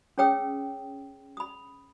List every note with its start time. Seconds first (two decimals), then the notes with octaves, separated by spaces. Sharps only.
0.18 C#4 G#4 C#5 G5 D#6 E6
1.37 B5 D#6